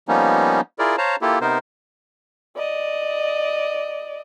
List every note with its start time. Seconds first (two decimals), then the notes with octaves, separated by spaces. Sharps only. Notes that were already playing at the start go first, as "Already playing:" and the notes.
0.08 F3 G3 A#3 B3 C#4 D#4
0.79 E4 F4 G#4 A#4 D5
0.98 C5 C#5 F5 A5 A#5
1.22 A#3 E4 F4 G4 A4
1.41 C3 B3 D#4 A#4 C5
2.56 D5 D#5